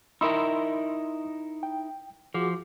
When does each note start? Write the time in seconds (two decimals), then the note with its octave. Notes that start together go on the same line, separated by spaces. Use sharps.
0.21 D#4 E4 A#4 B5 C6 E6
1.63 G5
2.34 F3 F#4 G#4 D6